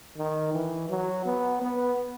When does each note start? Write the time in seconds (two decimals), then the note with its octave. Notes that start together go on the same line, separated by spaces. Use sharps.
0.18 D#3
0.53 E3
0.89 F#3
1.25 B3
1.62 B3